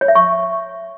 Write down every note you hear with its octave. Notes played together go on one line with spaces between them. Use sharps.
C#5
E5
C#6